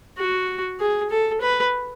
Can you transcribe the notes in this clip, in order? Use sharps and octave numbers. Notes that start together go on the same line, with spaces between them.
F#4
G#4
A4
B4